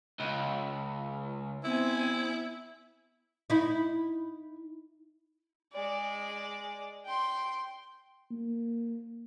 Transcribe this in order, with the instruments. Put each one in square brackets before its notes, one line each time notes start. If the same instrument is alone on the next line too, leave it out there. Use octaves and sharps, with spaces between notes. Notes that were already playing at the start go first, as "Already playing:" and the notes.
[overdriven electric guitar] C#2
[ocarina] B3 [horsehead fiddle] C4 G#5 [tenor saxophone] E4
[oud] D#4 E4
[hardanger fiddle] G#3 D5
G5 C6
[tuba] A#3